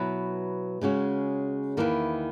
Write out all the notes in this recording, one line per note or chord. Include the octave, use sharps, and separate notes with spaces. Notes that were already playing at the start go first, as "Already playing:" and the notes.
Already playing: B2 F#3 B3 E4 B4
C#3 G#3 C#4 F#4
E2 D#3 A#3 E4 B4